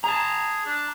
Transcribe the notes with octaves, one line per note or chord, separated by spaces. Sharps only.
G#4 A5 A#5
D4